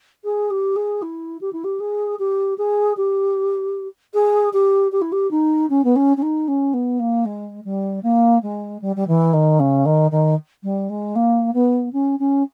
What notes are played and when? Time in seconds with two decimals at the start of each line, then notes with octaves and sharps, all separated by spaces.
0.24 G#4
0.50 G4
0.76 G#4
1.02 E4
1.41 G4
1.52 E4
1.64 G4
1.80 G#4
2.19 G4
2.58 G#4
2.97 G4
4.13 G#4
4.53 G4
4.92 G4
5.01 E4
5.12 G4
5.31 D#4
5.69 C#4
5.84 B3
5.96 C#4
6.17 C#4
6.22 D#4
6.48 C#4
6.73 B3
6.99 A#3
7.25 G#3
7.64 G3
8.03 A#3
8.42 G#3
8.81 G3
8.96 G3
9.07 E3
9.33 D#3
9.59 C#3
9.85 D#3
10.11 D#3
10.63 G3
10.89 G#3
11.15 A#3
11.54 B3
11.93 C#4
12.19 C#4